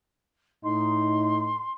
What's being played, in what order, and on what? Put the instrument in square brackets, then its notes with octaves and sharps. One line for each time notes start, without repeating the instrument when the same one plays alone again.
[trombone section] A2 D#4 [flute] C6